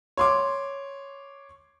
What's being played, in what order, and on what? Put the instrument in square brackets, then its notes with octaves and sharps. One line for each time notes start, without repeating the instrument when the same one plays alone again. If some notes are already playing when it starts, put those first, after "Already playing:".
[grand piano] C#5 C6 D6